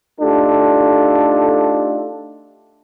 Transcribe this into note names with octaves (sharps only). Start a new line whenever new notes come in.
A3 D4 D#4 F4 G4 A4